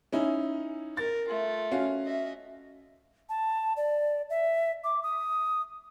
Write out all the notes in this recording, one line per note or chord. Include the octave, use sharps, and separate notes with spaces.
C#4 D#4 E4
A#4 A6
A3 F4
C#4 F#4 F5
D#5 E5
A5
D5
E5
D6
D#6